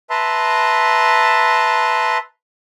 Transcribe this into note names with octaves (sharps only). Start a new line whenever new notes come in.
B4 E5 A5 A#5 C6